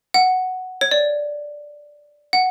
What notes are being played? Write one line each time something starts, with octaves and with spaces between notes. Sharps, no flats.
F#5
C#5
D5
F#5